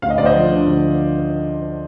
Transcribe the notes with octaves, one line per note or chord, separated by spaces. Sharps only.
D2 F5
D#5
D2 D5
C5 D#5
F3
D3
D2